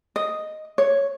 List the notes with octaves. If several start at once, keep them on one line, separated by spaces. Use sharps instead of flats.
D#5
C#5